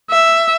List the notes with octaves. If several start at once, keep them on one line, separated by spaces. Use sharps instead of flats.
E5